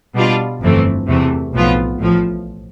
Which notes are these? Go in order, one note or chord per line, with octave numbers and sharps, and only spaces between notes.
B2 G3 D4 F4
G1 F2 E3 A3 C4
E2 C3 E3 A3
B1 A2 F3 B3 F4
A1 A2 F3